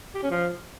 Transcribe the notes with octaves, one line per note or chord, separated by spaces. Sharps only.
G4
C#4
F3